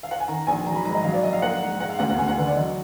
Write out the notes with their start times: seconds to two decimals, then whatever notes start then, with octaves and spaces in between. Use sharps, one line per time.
0.03 F5
0.11 F#5
0.20 G#5
0.28 D#3 A#5
0.47 A#1 G#5
0.66 F#3 A#5
0.75 B5
0.85 G#2 A#5
0.94 D#5
1.04 F#3 F5
1.13 D5
1.23 A#1 D#5
1.33 F5
1.42 A#3 F#5
1.62 G#2
1.80 G#3 F#5
1.90 F5
1.99 D2 F#5
2.09 F#5
2.18 D2 G#5
2.28 F#5
2.37 D3 B4
2.47 D5
2.56 F#3 D#5